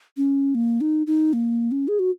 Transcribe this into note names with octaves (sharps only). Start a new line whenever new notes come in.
C#4
A#3
D#4
D#4
A#3
C#4
G#4
F#4